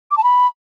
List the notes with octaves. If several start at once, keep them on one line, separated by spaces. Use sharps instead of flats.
D6
A5
B5